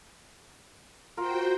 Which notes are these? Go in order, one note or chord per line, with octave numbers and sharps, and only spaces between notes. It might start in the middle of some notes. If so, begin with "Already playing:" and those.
F4 F#4 A#4 C5 G5